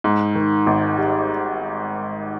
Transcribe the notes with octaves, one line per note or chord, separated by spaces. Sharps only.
G#2
D#3
G#1
G3